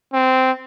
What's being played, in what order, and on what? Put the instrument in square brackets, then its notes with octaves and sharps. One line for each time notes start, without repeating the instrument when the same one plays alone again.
[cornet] C4